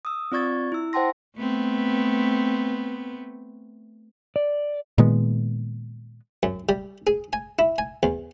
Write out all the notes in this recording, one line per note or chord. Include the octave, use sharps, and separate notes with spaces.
D#6 E6
C4 F4 D5 C#6 G#6 A6
E4 E6
C5 F#5 G5 A5 C6 A#6
A3 B3 C4
D5
A#2 D#3 G#3 B3
F#2
G3
G#4
G#5
E4
G#5
E2